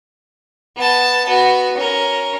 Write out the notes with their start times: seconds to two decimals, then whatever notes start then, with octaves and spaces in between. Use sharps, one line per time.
0.76 B3 A5
1.26 B3 F#4
1.77 C#4 A#4